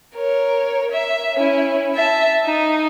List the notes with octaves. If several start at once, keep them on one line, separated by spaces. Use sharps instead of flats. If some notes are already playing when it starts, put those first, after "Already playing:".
A#4 C#5
E5
C#4 E4
E5 A5
D#4